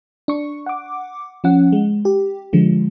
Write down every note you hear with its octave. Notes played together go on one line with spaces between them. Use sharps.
D4 C#6
F#5 D6
F3 C#4 F#5
G#3
G4
D3 F3 G#3